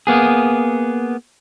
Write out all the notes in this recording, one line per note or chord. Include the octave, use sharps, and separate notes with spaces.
A#3 B3 G#4